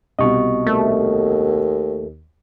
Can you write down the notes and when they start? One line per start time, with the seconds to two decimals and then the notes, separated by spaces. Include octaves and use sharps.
0.19 C2 B2 D#5 C#6
0.67 D#2 A3